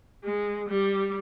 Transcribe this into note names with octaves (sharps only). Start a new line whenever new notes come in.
G#3
G3